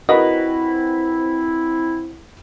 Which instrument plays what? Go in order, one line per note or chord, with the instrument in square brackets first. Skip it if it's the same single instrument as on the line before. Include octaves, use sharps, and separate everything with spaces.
[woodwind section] C4 E4 [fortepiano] F#4 A#4 B4 [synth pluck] D#5